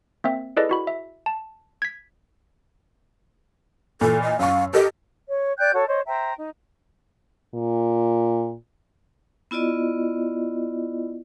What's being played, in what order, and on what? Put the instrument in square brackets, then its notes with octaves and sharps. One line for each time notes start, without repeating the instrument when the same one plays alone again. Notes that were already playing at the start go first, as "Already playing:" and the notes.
[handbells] A#3 C4 E5
E4 G#4 A4 B4 D5 D#5
E4 F#4 B5
E5
A5
G#6 B6
[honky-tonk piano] A#2 E3 [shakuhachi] A4
[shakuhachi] D#5
[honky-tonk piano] F#2 C#6 [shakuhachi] F5
[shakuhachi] G4 [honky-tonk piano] A4 A#4 D#5
[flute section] C#5
D5 G5 F#6 G6
F#4 A4 C#5
C5 C#5 D#5
C5 E5 G5 A#5
D#4
[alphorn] A#2
[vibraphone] B3 E4 F4 D5 D#5